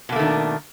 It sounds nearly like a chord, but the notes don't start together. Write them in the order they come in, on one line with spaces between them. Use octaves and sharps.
B2 A#3 A3 D#3 D4